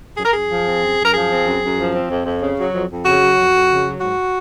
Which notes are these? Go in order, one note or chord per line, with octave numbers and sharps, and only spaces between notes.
F#2 G#4
A#4
F#2 G#4
F3
C4
F#2
F#2
A#4
F3 G#4
C4
F#2
F#2
F3
C4
F2
F2
C#3
F#3
F2
F2
C#3 F#4
F#3
F2
F2
C#3
F#3
G#2 F#4